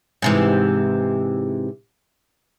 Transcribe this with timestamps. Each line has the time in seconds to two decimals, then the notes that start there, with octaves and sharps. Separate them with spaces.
0.22 G#2 C3 E3